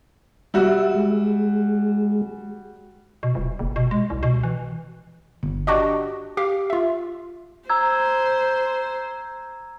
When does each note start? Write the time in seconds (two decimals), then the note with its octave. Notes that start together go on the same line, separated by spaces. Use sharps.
0.54 G3 F#4 E5
0.95 G#3
3.23 B2
3.35 D#1
3.59 F#1
3.76 B2
3.91 G#3
4.10 C2
4.23 B2
4.43 E3
5.43 G1
5.67 D4 F#4 G4 D#5
6.37 G4 F5
6.70 F4 E5
7.69 C5 A#5 E6 G#6